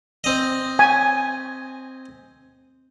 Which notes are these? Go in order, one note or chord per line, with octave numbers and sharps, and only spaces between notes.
C4 D#5
G#5